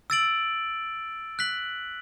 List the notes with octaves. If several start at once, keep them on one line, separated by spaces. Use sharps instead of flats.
E6 A6 D7 F#7
F#6 B6 F#7